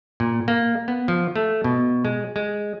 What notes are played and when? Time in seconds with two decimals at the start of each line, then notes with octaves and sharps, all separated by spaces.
0.20 A#2
0.48 A#3
0.88 B3
1.08 F3
1.36 A3
1.64 B2
2.05 G#3
2.36 G#3